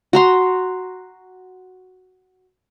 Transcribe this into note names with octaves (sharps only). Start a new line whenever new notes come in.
F#4 A#5 C6